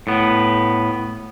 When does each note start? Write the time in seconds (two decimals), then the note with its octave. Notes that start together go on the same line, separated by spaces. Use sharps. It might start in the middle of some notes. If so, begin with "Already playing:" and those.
0.07 A2 B3